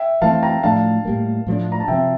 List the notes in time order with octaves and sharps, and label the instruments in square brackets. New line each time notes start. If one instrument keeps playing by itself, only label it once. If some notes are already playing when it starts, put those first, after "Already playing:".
Already playing: [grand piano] E5 G5
[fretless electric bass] E3 A3 C4 [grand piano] F5 A5
[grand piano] G5 A#5
[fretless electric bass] A2 F3 A3 D4 [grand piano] F5 A5
[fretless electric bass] A2 G3 A#3
A2 F3 A3 D4
[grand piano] A#5
A5
[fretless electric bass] C3 F3 C4 [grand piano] E5 G5